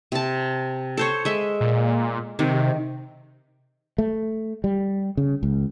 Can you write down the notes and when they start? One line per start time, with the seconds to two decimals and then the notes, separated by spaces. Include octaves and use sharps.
0.12 C3 A5
0.97 A4 C5 C#5
1.25 G#3 E5
1.61 A#2
2.39 C3 D#3
3.98 A3
4.64 G3
5.17 C#3
5.43 C#2